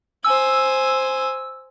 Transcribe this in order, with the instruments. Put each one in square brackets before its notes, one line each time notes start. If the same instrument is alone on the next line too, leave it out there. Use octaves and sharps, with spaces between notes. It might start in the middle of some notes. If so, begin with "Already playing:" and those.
[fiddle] C5 G#5 [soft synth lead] E6